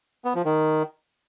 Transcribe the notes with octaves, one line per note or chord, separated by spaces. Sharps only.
B3
F3
D#3